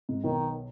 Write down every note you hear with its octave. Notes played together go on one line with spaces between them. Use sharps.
G#2
B1 B2 D#3